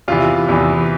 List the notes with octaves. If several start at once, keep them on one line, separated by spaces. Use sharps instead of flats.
E2 C3 E3 F4
E2 C3 E3